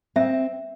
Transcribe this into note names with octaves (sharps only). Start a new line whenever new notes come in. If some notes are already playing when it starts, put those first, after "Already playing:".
C4 E5